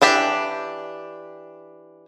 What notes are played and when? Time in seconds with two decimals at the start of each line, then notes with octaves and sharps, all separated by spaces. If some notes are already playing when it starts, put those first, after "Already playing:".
0.02 E3 D4 G4 G5